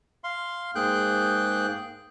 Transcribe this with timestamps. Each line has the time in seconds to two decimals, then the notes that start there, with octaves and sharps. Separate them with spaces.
0.24 F5 C6
0.75 G#2 A#3 G#4 G5 F#6 G6